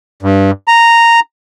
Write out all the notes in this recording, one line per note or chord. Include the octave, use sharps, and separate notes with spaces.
G2
A#5